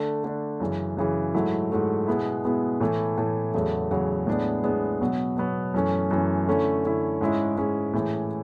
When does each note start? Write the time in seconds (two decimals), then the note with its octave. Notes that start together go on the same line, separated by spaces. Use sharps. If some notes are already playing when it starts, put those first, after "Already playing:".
Already playing: D3 A3 D4
0.24 D3 A3 D4
0.60 F#2 C#3 E3
0.97 F#2 C#3 E3
1.34 G#2 F#3 A3 E4
1.71 G#2 F#3 A3 E4
2.07 B2 G#3 B3 E4
2.44 B2 G#3 B3 E4
2.80 A2 E3 A3
3.18 A2 E3 A3
3.54 E2 C#3 F#3 A3
3.91 E2 C#3 F#3 A3
4.27 A2 G#3 B3 D4
4.64 A2 G#3 B3 D4
5.00 B2 F#3 B3
5.37 B2 F#3 B3
5.74 F#2 E3 A3 C#4
6.11 F#2 E3 A3 C#4
6.48 D3 A3 C#4 E4
6.84 D3 A3 C#4 E4
7.21 G#2 G#3 C#4 E4
7.57 G#2 G#3 C#4 E4
7.93 A2 E3 G#3